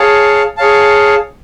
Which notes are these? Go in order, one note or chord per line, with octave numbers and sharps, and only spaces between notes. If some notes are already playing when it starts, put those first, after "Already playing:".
Already playing: G#4 C#5 F5 A5
G#4 C#5 F5 A5